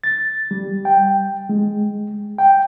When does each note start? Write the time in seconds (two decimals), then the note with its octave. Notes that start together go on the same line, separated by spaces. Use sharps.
0.04 A6
0.51 G3
0.85 G5
1.49 G#3
2.38 G5